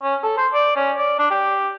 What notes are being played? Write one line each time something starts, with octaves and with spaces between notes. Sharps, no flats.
C#4
A4
C5
D5
C#4
D5
D4
G4